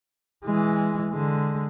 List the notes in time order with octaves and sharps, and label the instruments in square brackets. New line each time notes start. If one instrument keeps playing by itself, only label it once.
[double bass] E3 G#3
D3 G#3